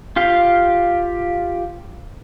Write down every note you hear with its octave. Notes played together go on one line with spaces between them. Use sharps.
F4 G4 F5